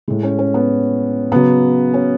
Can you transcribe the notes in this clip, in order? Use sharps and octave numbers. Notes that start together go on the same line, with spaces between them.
A2 G#3
C#4
C#4
B3
C#3 F#3 B3
C#4